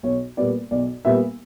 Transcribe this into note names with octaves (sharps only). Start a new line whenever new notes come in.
B1 C#5
A#2 G3 B3 D5
B1 D5
A#2 G3 B3 E5